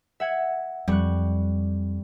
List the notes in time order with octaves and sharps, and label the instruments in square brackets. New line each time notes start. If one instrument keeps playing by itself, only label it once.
[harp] E5 F#5 G#6
[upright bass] F2 [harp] G3 C#6 F#6